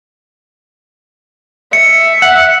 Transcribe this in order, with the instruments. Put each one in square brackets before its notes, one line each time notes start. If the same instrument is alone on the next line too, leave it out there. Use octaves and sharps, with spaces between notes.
[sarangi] E5 [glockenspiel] C#7
[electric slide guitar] F#5